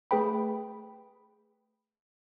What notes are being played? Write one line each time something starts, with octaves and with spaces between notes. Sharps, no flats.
A3 G#4 B4 G5 B5